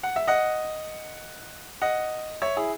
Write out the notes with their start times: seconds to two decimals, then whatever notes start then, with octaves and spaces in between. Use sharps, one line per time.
0.03 F#5
0.16 E5
0.27 D#5 F#5
1.82 D#5 F#5
2.42 C#5 E5
2.56 E4 G#4